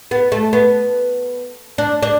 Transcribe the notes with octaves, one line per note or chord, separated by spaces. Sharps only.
B3
A3
B3
D4
D4